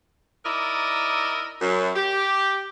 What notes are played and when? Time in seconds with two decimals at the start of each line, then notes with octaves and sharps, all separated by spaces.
0.45 D#4 E4 A#4 D5 D#5
1.61 F#2
1.95 G4